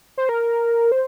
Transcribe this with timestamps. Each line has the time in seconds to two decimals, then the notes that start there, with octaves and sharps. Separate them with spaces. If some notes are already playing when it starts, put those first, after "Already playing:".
0.17 C5
0.29 A#4
0.92 C5